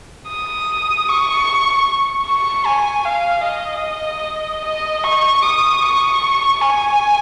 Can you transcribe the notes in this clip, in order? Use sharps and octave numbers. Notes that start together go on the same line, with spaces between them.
D#6
C#6
C#6
G#5
F5
D#5
D#5
C#6
D#6
C#6
G#5